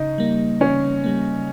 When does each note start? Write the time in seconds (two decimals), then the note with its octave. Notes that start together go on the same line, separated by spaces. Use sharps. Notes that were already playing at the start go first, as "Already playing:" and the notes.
Already playing: C#3 D#4
0.18 G3 A#3
0.60 C#3 C#4
1.04 G3 A#3